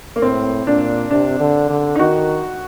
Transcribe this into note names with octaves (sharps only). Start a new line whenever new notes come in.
A#3
A2 C4
A#2 D4
C3 D4
D3
D3
D#4
D#3 F#4